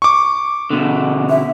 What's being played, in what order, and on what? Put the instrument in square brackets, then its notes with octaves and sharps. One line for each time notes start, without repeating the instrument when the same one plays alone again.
[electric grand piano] C#6 D6
[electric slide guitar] B2 D3
[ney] E5